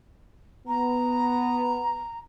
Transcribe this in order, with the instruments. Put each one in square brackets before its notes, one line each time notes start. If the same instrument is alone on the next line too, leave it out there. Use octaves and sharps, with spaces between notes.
[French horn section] B3 [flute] A#5